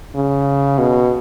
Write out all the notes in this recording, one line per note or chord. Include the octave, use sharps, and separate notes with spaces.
C#3
B2